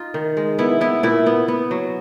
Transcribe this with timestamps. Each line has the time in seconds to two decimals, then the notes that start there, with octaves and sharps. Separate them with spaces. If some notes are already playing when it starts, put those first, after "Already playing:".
Already playing: D#4 F4
0.14 D#3
0.37 G#3
0.59 B3 E4
0.81 B3 E4
1.03 A#2 E4
1.26 B3
1.48 B3
1.71 F#3